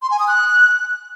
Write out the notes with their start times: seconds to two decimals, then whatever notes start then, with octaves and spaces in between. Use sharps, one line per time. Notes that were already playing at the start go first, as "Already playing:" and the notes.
0.02 C6
0.11 G#5
0.19 D#6
0.28 F#6